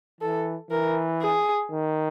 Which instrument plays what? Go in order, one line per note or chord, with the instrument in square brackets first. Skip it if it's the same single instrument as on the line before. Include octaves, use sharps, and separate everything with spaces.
[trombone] E3 [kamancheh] A4
[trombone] E3 [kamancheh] A#4
[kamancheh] G#4
[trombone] D#3